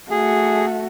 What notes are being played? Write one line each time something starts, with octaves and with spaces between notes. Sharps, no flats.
A3 F#4 G#4